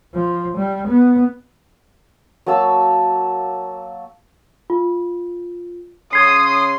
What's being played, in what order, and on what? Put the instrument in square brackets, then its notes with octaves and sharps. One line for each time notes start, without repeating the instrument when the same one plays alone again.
[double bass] F3
G3
B3
[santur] F#3 A#3 A5 E6
[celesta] F4
[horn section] C#3 C#4 C6 [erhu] D#6 [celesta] G#6 C7